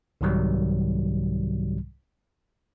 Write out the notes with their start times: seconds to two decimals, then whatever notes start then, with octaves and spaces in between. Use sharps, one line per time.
0.21 C2 G#2 C3 D#3 F#3 G3